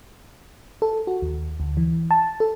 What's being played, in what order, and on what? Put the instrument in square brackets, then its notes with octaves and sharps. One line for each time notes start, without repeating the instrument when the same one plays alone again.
[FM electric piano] A4
F#4
D#2
D2
E3
A5
A4